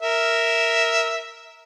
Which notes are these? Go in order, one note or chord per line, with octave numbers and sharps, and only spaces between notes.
A#4 E5